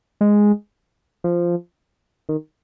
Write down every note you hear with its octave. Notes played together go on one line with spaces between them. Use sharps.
G#3
F3
D#3